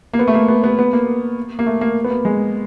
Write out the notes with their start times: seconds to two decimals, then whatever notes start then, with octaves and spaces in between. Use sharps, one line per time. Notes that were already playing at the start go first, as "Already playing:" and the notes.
0.13 A#3
0.19 B3
0.28 A3
0.34 A#3
0.49 B3
0.64 B3
0.79 B3
0.93 A#3
1.59 A#3
1.66 A3
1.81 A#3
2.04 B3
2.10 A#3
2.25 G#3